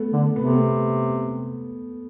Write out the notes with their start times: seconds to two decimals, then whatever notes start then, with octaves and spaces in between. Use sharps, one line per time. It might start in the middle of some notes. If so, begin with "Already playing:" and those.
Already playing: A3 B3
0.13 D3
0.36 C3 B3
0.45 A3
0.53 B3